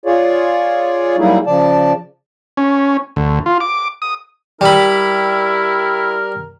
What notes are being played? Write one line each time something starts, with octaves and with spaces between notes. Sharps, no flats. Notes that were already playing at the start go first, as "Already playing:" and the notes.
F4 G#4 C#5 D5
F#3 G3 A#3 D#4 E4 G#4
C#3 F3 D5 A5
C#4
D2
F4
D6
D#6
G3 E4 A#4 B5